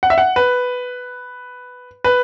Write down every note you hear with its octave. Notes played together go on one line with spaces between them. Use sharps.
F#5
E5
F#5
B4
B4